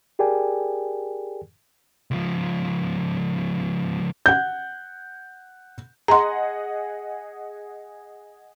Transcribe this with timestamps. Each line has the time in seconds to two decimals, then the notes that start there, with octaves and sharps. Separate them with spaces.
0.19 G4 G#4 A#4 D5 G5 G#5
2.11 C#2 F3
4.26 F#5 G6
6.08 G#4 D#5 F#5 A#5 C6